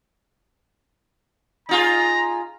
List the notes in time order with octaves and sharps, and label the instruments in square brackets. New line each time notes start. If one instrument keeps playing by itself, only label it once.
[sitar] D#4 F4 G#4 [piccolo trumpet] A#5